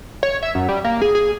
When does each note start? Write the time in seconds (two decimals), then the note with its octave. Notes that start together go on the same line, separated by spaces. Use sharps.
0.23 C#5
0.43 E5
0.55 F#2
0.69 G3
0.84 A#3
1.02 G#4
1.15 G#4